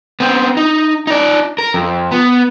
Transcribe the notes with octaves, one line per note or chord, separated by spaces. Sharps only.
B3 C4
D#4
D#4 D5
A#4
F2
B3